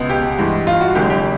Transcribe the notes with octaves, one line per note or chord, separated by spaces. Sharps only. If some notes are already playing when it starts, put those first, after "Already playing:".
Already playing: C#2 B2 G#3 B3
G4
G2 E3 G#3
F4
F#4
F#1 F#2 D#3 G#3 G4
G4